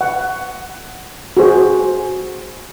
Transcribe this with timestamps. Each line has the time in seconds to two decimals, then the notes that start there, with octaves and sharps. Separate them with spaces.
0.01 F#5
1.37 F#4 G#4 C5